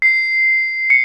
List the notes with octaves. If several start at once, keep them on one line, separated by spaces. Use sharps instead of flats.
C7
C#7